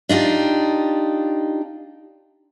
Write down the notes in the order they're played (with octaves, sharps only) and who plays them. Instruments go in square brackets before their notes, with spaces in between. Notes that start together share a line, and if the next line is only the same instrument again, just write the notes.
[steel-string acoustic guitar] D4 D#4 F4 G4